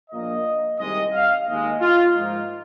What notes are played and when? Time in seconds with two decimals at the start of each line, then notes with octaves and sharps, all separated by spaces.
0.10 A#1 A#2 A#3 D#5
0.78 C2 C3 D#3 G#3 D#5
1.13 F5
1.46 D#2 D#3 G#3 D#5
1.81 F4
2.15 G#2 F3 A#3 D#4